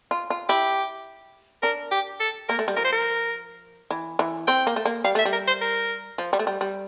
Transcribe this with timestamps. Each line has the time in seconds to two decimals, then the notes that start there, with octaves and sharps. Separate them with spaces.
0.11 F4
0.30 F4
0.49 E4 G4
1.63 D4 A#4
1.92 G4
2.20 A4
2.49 A#3 A#4
2.59 A3
2.68 G3
2.77 F3 A#4
2.85 C5
2.93 A#4
3.91 E3
4.19 E3
4.47 C4 G5
4.67 A#3
4.76 A3
4.85 A#3
5.04 G3 F5
5.15 A3 E5
5.25 G3
5.33 A#4
5.47 C5
5.61 A#4
6.18 F3
6.33 G3
6.39 A3
6.47 G3
6.61 G3